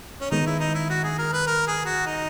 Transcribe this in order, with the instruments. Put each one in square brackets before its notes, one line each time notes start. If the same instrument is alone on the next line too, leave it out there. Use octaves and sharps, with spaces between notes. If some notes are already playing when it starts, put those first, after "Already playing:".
[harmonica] C#4
[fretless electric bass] D#3 G#3 B3 [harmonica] D#4
[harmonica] E4
D#4
E4
F#4
G#4
A#4
B4
A#4
G#4
F#4
D#4